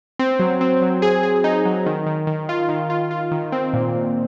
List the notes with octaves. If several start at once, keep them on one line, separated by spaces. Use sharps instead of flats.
C4
F#3
C4
F#3
G#4
G#4
D#4
F#3
D#3
D#3
D#3
F4
D#3
F4
F4
D#3
C4
A#2
A#2